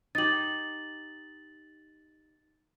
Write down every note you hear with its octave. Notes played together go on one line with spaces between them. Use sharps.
D#4 G4 A6 F#7